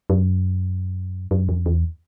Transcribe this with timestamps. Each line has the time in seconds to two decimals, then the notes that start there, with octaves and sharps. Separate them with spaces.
0.10 F#2
1.31 F#2
1.49 F2
1.66 E2